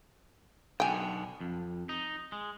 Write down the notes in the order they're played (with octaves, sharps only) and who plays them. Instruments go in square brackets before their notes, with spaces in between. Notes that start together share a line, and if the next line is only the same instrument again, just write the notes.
[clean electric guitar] B1 B2 D3 [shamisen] G5 G#5
[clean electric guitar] F2
D#4
G#3